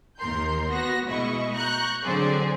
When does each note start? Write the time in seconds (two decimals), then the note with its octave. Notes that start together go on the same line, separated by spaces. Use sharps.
0.19 D#2 A#4 C6 G6
0.69 B3 F#4 A#6
1.07 B2 G#3 E4 D#5 C#6
1.54 A#5 C#6 F#6 G6
2.04 D3 F#3 C4 G#4 C5 D5